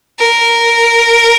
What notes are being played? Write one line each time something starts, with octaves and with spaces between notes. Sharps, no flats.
A#4